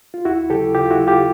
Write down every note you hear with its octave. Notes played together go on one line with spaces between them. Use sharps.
F4
D#2 E4 F#4
C#3 F#3 G4 A4
D#2 F4 G4
E4 F#4
C#3 F#3
F4 G4